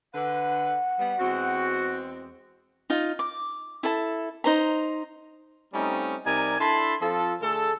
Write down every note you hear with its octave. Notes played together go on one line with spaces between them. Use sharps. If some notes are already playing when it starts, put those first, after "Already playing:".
D3 B4 F#5
G3 B3
E2 G#3 C4 F#4
D#4 F4
D6
E4 A4 A5
D#4 C5 A#5
G3 A3 C4 C#4 D#4
C3 G3 D#4 A#4 D5 G#5
D4 E4 A4 A5 B5 C6
F3 C4 F4 A4
D3 A3 G#4 A4